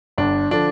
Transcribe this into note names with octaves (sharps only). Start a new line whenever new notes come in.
G1 D4
D3 F3 D4